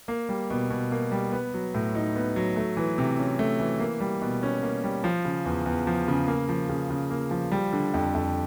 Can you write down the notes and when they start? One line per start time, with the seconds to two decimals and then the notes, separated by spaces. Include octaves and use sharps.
0.08 A#3
0.29 G3
0.50 B2
0.70 B2
0.92 A#3
1.12 G3
1.32 B3
1.54 F#3
1.75 A2
1.95 D#4
2.16 B3
2.36 F#3
2.56 A3
2.77 E3
2.98 C3
3.19 C#4
3.39 A3
3.60 E3
3.80 A#3
4.00 G3
4.22 B2
4.43 C#4
4.63 A#3
4.84 G3
5.04 F3
5.25 C#3
5.45 E2
5.66 E2
5.87 F3
6.08 C#3
6.28 A#3
6.49 F3
6.69 C#3
6.90 C#3
7.10 A#3
7.31 F3
7.52 G3
7.73 D3
7.94 F2
8.15 F2